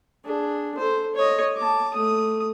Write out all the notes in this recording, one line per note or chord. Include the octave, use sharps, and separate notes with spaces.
D4 G#4
A4 C5
C#5 D#5
A5 D6
A3 D#6